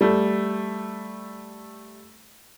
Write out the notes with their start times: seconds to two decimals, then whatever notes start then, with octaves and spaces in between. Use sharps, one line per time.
0.01 G3 A3